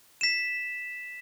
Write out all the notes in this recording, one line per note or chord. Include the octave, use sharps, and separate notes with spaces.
B6 E7